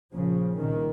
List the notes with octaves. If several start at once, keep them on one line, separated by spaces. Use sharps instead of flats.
A#1 A#2 C#3 F3
C2 A#2 D#3